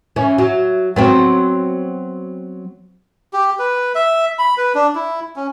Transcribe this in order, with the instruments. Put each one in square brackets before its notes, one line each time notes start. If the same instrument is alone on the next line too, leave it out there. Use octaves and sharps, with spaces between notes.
[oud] E3 C#4
F#3
F#3 B3 C4
[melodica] G4
B4
E5
B5
B4
D4
E4
C#4